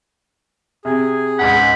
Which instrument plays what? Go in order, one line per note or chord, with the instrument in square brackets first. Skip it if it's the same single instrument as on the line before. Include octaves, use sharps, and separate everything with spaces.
[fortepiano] C3 [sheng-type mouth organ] G#4
[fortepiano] C#2 G#2 F#5 [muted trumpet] B5